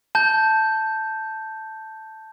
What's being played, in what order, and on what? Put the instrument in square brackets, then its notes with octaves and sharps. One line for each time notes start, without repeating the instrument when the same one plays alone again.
[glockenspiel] A5 G6